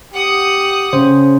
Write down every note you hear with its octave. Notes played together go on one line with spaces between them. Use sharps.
G4 F#5 D#6
C#3 C5